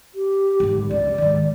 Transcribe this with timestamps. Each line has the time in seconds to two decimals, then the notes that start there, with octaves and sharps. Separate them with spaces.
0.15 G4
0.60 G#1 D3
0.91 C#2 D5
1.18 G#2 D#3